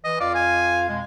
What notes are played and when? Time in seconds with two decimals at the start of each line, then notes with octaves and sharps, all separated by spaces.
0.04 E3 D#5
0.20 F2 F4 D5 F5
0.35 G#5
0.89 F2 B2 G#3